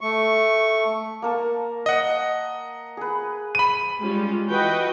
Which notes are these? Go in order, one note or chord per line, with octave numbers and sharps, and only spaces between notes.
A3 C#6
A#3 A#4 A5
D#5 F#5
G#4 B4
B5 D#7
G3 G#3 C#4 F4 G4
E3 F#4 B4 D#5 G5